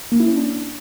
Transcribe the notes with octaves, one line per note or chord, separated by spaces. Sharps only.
A#3
E4
C#4
D4